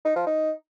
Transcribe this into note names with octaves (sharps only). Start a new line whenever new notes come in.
D#4
F3
D#4